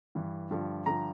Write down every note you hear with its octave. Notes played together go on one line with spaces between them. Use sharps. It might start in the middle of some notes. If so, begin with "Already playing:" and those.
G2 E3
G2 D3 F3
G2 D3 F3 A#5